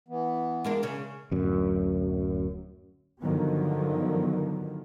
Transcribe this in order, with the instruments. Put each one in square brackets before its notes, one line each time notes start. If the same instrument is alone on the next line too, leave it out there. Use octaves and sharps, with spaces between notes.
[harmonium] E3 B3
[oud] G#3 A#3 D4
C#3 C#4
[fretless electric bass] D1 F#2
[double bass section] G2 D3 D#3 F3 F#3 B3